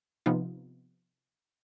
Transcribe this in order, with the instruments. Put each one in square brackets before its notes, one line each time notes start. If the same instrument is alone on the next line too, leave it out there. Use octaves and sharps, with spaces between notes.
[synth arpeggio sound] C3 F3 B3 D#4 F4